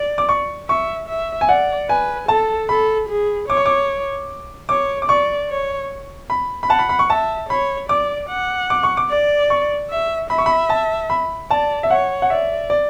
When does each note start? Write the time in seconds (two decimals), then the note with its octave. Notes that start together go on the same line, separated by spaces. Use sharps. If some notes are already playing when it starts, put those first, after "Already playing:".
Already playing: D5
0.18 D6
0.29 C#6
0.69 E5 C#6
1.08 E5
1.41 G#5
1.49 D5 F#5
1.89 B4 G#5
2.28 A4 A5
2.69 A4 B5
3.09 G#4
3.49 C#5 D6
3.57 C#6
3.66 D6
4.69 C#5 D6
5.02 D6
5.09 D5 C#6
5.50 C#5
6.30 B5
6.63 B5
6.69 F#5 A5
6.79 B5
6.89 B5
6.99 C#6
7.10 E5 A5
7.49 C#5 B5
7.89 D5 D6
8.29 F#5
8.70 D6
8.83 C#6
8.97 D6
9.09 D5
9.50 C#6
9.90 E5
10.30 E5 B5
10.38 C#6
10.46 B5
10.70 A5
11.10 B5
11.50 D5 A5
11.83 E5
11.90 C#5 F#5
12.22 F#5
12.30 D5 E5
12.70 D5